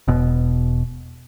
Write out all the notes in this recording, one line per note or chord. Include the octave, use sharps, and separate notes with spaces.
E1 B2